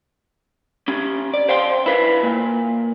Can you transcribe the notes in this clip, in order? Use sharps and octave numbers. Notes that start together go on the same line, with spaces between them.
C#4 G4
D5
C5 F5 G5 C6
E4 B4 F5
A#2